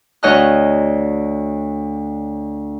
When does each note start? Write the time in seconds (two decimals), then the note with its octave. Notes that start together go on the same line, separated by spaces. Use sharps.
0.23 D2 C#5 D#5 A5 F6 F#6